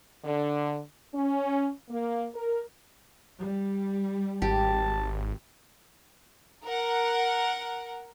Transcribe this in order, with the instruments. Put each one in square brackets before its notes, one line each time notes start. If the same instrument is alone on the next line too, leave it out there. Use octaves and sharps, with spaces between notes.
[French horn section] D3
C#4
A#3
A#4
[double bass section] G3
[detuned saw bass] G#1 [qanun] G4 [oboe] A5
[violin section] A#4 F#5